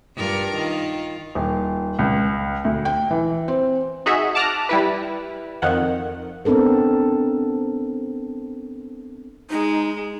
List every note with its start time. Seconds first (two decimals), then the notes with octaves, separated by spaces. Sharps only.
0.16 G2 F4 A#4
0.55 D#3 F4
1.35 D#1
1.99 C#2
2.65 D2
2.85 G5
3.11 E3
3.48 C4
4.06 D#4 F#4 G#4 E5
4.35 A5 D6 F6 F#6 A#6
4.69 G3 E4 B4
5.62 F2 D#3 F#5
6.45 B3 C4 D4 A4 A#4
9.50 G#3 D#4